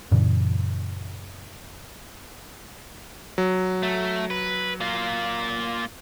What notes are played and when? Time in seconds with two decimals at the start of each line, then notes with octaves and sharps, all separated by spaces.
0.11 F#2 A#2 C#3 E3
3.38 F#3
3.83 A3
4.30 B4
4.80 A#3 F4